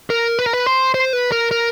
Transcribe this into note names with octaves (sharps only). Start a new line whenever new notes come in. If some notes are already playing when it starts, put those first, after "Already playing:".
A#4
B4
A#4
B4
C5
C5
B4
A#4
A#4